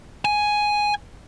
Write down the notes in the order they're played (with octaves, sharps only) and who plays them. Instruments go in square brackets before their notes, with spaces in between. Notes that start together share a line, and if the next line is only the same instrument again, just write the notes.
[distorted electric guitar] G#5